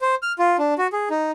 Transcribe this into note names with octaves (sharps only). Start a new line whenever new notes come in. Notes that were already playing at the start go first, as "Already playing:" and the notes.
C5
F6
F4
D4
F#4
G#4
D#4